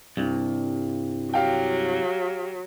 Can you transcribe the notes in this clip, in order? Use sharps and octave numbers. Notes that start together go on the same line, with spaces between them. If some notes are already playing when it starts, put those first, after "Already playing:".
C2 G2
F#3 G4 F5 G5